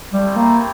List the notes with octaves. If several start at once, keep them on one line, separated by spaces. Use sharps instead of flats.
G3 A3 C4 E4 G4
A#3